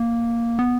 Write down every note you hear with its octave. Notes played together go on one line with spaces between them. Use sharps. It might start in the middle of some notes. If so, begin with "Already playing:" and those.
Already playing: A#3
B3